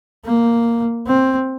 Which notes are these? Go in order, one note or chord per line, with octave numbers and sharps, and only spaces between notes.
A#3
C4